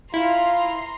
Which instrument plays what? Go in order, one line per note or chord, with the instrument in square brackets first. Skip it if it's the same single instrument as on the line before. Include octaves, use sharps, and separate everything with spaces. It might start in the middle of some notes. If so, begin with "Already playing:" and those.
[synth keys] E4 [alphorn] F4 [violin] A#5 C6